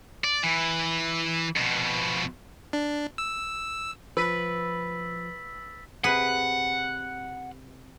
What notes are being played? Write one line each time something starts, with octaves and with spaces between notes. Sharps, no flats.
D5
E3
F2 B2
D4
E6
F3 B4 E6 A6 B6
C3 G#4 B4 F#5